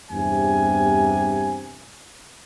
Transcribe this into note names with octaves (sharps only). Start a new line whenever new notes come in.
E2 G2 C3 G#5